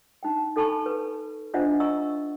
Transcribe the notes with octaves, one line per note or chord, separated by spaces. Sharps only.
D#4 G5
D#4 A4 G#5 A5 B5 C#6
B4
D4 F4 C5 D#5 E5 F#5
D#5 A#5 C#6 E6